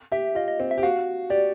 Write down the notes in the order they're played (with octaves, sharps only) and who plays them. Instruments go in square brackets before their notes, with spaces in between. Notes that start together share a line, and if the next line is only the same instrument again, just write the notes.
[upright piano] G4 [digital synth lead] E5
[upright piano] F4 [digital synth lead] D#5
[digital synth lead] D#5
[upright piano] C4
[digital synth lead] E5
[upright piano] G4
[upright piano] F#4 [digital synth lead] F5
[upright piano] G4 [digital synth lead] D5